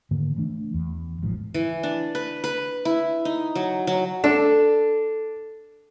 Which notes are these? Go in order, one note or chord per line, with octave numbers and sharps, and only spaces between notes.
G#2 D3 D#3 A#3
E3 A3 D4
E2
E1 A1 G#2 F3
E3
D4
B4
B4
E4
D#4
F#3
F#3
D4 A4